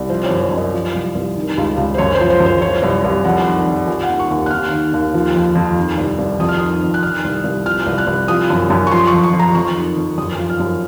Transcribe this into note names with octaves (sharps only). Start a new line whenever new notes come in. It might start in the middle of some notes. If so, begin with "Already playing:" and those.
Already playing: C2
F3 C5
C#5
F#2
C#5
F#2
D#5
F3
C2
C2
D#3
C#2
C#2
C5
F#2 C#5
C5
F3
C5
F#2
C5
F3 C#5
C2
C2
F2 F#5
D#3
F2
F3 G#5
F#5
D#2
C#6
D#2
F#6
D#2 F6
D#3
D#2
F3
F2
F2
D#3
C2
C2
F2 D#6
F6
D#3 D#6
F2
F#6
D#3 F6
C2
C2
F3 F6
C2
F#6
C2
F3 D#6
F#2
F#2
C#6
F3 C6
F2 C#6
C#6
F2
A#5
F2 C#6
D#3
F2
F#2 D#6
F3
F6
F#2